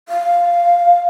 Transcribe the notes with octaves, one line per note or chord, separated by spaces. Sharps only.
F5